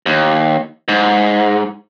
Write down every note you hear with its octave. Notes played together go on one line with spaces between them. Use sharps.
D#2
G#2